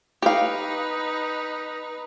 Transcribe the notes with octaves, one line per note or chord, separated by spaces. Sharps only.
D#4 G4 B4 F5